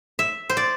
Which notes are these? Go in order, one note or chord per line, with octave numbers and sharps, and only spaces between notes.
E5
C5
D5